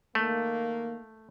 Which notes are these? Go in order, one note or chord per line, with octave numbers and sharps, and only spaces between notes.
D#3 A3 A#3